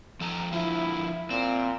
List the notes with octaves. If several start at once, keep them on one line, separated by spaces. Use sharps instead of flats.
F3 A4 A#5
D3 F3 E4 F4
A#2 C4